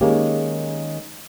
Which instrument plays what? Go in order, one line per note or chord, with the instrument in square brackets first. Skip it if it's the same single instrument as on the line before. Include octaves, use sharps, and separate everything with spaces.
[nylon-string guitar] D#3 G#3 A#3 C#4 G4